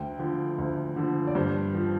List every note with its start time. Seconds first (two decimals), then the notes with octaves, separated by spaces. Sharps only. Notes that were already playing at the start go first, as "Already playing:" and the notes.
Already playing: D2 G5
0.19 D3 F3
0.58 D2
0.96 D3 F3
1.27 D5
1.35 G2 C5
1.75 F3